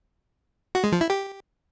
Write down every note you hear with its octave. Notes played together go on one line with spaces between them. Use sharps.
F#4
G#3
F3
E4
G4